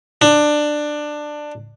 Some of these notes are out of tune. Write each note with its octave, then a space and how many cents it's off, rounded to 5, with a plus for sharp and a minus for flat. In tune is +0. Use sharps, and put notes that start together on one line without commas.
D4 +15